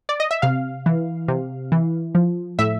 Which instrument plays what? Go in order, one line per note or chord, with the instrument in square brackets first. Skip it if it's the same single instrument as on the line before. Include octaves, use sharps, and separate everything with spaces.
[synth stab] D5
D#5
E5
C3 F5
E3
C3
E3
F3
A2 E5